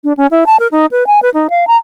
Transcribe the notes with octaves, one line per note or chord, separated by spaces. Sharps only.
D4
C#4
E4
A5
A#4
D#4
B4
G#5
B4
D#4
F5
A#5